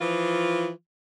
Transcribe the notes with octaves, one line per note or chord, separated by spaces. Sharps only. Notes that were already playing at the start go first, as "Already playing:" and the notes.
E3 F3 F4